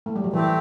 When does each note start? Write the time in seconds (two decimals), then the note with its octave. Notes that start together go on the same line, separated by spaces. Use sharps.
0.06 A3
0.16 G3
0.24 F#3
0.33 E3 A3 C4 G4